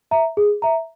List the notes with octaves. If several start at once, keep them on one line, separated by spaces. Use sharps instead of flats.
E5 A#5
G#4
E5 A#5